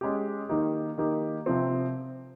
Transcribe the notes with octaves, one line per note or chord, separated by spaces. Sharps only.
G#3 C#4 G4
D#3 A#3 D#4 G4
D#3 A#3 D#4 G4
C3 F3 C4